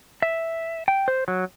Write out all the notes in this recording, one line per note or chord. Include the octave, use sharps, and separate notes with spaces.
E5
G5
C5
F#3